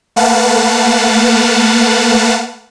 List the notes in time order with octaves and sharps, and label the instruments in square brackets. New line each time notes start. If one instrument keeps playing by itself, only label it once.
[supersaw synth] A3 A#3 B4 F5 F#5 A5